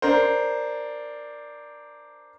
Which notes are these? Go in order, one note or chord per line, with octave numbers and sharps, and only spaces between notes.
D4 A#4 C5